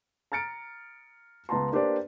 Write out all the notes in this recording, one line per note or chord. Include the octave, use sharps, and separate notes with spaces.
A#5 F6 A6 C#7 D7
C#2 B3 A5 A#5 C6
A#3 D4 G4 B4 C5 D5